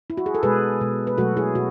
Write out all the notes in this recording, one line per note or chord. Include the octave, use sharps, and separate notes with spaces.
E4
F#4
G#4
A4
B2 G#3 G#4 B4
B2 G#3
B4
B2 F#3 A3 F#4 A4
E4 G#4
B2 F#4